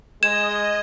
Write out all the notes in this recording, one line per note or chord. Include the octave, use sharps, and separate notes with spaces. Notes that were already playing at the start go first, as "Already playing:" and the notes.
G#3 D#5 G#6 E7